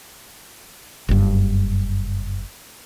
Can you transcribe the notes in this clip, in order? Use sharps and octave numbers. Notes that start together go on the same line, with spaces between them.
F#1 G2